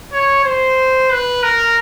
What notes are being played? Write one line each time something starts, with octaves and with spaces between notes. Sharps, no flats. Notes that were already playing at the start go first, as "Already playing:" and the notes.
C#5
C5
B4
A#4